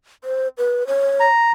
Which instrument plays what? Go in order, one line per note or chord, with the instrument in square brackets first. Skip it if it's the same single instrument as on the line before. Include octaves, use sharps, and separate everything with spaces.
[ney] C5
B4
C#5
[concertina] A#5